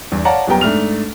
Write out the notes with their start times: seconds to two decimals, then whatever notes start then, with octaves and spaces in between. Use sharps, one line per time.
0.12 E2 G2
0.25 C#5 D5 F5 F#5 A5 A#5
0.47 D#1 F#2 G3 B3 G5 A#5
0.61 G#2 A3 D4 F6 F7